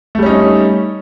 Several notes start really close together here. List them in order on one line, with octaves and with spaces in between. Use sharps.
A3 G3 C#4 D#4